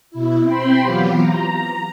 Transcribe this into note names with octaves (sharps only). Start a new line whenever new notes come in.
B2 E4
C4 G5 B5 C6
E3 F#3 B3 F4 G4
A#5